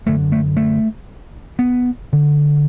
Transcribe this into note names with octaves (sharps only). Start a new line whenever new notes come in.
F#2 D3 A3
A3
A3
B3
D3